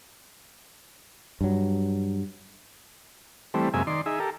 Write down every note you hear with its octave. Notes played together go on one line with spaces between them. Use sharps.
G2 F#3
E3 G3 A3 C4
F#2 C3 G#3 A#3 E5 G#5
D#3 D5 C6
D#4 G#4 E5
G4 A4 A#4